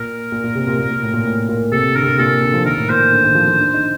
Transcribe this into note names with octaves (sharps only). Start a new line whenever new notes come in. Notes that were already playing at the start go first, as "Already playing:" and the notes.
Already playing: A#2 A#4
A#2
A#2
C3
A#2
A#2
A#2
A2
A#2
A2
A#2
C3 A4
D3 A#4
C3
A#2 A4
D3
F3
D#3 A#4
A2
A#2 C5
D3
D#3
F3
F3
D4
D#4